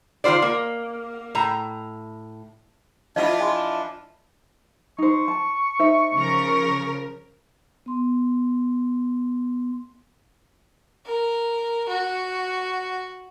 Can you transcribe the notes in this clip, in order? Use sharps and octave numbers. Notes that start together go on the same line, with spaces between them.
D#3 A#3 F4 C5 D5
A#3
A2 A#5
F3 D4 E4 F4 D#5 E5
D#5 G#5 C6
D#4 C5 C#6
A5
D#4 C5 E5
C#3 F3 A#4
B3 C6
A#4
F#4